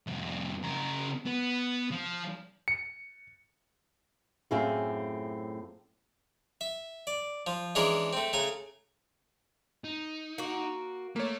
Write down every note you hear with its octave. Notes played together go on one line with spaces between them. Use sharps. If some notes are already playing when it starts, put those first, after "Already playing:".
C2 F2
C#3 A#4
B3
F3
C#7
F#2 A2 C4 F4 G#4 E5
E5
D5
F3
E3 G#3 C#4 D4 G#4 A#4
A3 C4
C#3 A3 G#5 A#5
D#4
A#3 F#4
A3 A#3 C#5